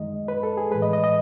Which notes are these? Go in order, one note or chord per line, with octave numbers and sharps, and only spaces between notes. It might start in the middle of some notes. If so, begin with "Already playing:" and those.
Already playing: F#2 D#3 G#3 D#5
B4
A4
G#4
A2 E3 G#3 B4
D#5
D#5
D#5